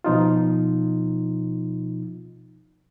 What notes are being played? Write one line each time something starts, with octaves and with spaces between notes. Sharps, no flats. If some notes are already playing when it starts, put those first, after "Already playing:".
B2 F3 D#4 F4